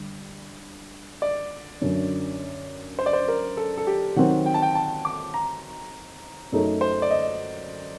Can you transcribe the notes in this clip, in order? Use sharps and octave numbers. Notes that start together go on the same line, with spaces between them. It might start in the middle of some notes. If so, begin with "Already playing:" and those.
Already playing: D3 G3
D5
F#2 D3 F#3
C5
D5
C5
A#4
A4
A4
G4
D#3 F#3 C4 F#5
G5
A5
G5
A5
D6
A#5
F#2 F#3 A3 D#4
C5
D5
D#5